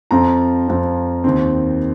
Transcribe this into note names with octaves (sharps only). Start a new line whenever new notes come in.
F2 F3 C4 A#5
F2 F3 C4
D#2 D#3 C4